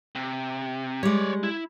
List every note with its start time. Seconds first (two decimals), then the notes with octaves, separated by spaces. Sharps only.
0.15 C3
1.03 G3 G#3 C#5 D5
1.43 E4